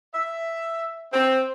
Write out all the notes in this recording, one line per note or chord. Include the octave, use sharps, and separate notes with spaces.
E5
C4